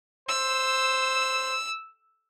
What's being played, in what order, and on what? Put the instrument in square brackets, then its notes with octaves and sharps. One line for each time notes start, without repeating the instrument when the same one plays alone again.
[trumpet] C5 [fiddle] E6